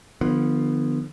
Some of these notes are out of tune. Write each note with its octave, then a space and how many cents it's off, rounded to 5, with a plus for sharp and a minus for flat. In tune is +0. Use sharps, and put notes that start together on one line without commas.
D3 +35 F3 +0 B3 +0